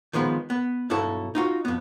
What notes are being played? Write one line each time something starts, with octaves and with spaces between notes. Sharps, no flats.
D#3 F3 G#3 B3
B3
B1 G2 E4 F#4 A4
D#4 F4 F#4
F2 B3